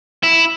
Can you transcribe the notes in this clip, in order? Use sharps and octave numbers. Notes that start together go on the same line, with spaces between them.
E4